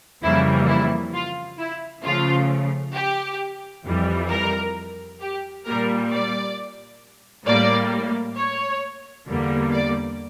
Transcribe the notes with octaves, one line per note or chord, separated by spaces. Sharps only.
F2 C#3 E3 G3 A#3 E4
E4
F4
E4
C#3 F3 A3 F4
G4
F2 E3 G3
A#4
G4
A#2 G3 A#3 A#4
D5
A2 G3 A#3 D5
C#5
E2 D3 G3 A#3
D5